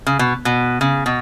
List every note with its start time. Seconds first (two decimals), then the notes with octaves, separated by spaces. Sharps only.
0.07 C#3
0.19 B2
0.45 B2
0.81 C#3
1.06 B2